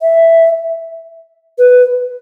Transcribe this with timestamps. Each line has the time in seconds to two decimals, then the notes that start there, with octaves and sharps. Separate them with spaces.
0.02 E5
1.59 B4